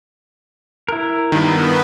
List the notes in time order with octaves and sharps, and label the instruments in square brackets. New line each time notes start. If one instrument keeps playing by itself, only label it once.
[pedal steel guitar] E4 A#4
[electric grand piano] G2 D#3 [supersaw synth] B3